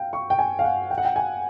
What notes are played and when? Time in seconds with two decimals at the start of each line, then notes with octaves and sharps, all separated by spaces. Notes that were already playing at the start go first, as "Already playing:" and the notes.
Already playing: F5 G5
0.13 C#6
0.30 G5
0.39 G#5
0.59 F5
0.64 F#5
0.90 G5
0.98 F#5
1.05 G5
1.16 G#5